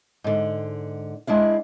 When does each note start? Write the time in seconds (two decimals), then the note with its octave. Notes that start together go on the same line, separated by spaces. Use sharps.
0.24 G#2 D3
1.27 G#3 D4 E4 F5